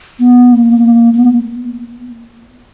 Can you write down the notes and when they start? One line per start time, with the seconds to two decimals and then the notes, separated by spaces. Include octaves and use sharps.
0.19 B3
0.52 A#3
1.13 A#3
1.18 B3